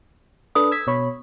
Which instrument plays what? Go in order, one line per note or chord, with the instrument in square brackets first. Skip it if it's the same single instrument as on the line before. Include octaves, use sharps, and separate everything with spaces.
[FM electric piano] D4 A4 B4 [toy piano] D#6
[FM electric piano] E6 G#6 B6
B2 C#5 B5